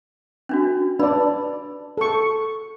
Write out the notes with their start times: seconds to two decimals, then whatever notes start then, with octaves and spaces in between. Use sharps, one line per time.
0.49 C#4 D4 F#4
0.99 D4 B4 D5 B5
1.97 A4 C#6